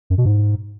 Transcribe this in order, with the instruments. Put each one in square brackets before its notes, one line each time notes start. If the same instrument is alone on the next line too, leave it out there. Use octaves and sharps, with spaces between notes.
[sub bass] F#2
B2
G#2